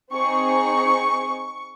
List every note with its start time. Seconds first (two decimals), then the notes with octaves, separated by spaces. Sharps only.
0.13 C4 D#4 G#4 C#6